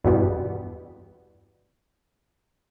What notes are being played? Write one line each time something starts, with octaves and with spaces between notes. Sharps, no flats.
E2 G2 B2 E3 G3 B3